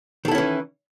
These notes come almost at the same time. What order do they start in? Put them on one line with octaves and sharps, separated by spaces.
D#3 A4 E4 C#4 E3